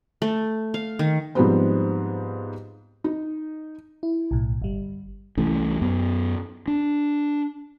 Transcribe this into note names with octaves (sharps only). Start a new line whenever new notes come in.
A3
F5
D#3
G#2 F3 G3 B3 C4
D#4
E4
B1 A2
G1 G3
C2 E3 A3 C#4
F#2 B3
D4